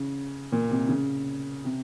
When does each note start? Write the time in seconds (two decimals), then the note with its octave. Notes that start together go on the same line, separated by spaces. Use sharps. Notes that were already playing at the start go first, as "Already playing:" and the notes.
Already playing: C#3
0.52 A#2
0.71 C3
0.89 C#3
1.65 C3